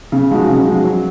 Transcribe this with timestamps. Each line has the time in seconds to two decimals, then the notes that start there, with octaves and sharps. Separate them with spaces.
0.12 C#3
0.30 F3 G#3 D#4 F#4
0.48 C#3
0.67 F3 G#3 D#4 F#4
0.85 F#3